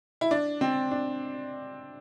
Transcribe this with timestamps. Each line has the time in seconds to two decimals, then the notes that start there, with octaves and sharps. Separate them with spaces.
0.21 E4
0.31 D4
0.61 C4
0.91 D4